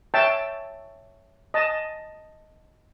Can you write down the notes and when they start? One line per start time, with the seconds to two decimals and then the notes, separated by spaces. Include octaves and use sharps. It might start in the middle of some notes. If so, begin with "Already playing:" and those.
0.14 C#5 E5 G5 A5
1.54 D#5 A5